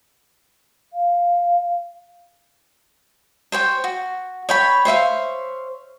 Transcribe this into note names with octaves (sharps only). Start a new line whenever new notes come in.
F5
C5 C#5 G5
F#4
C#5 G5 B5
C5 C#5 E5 F5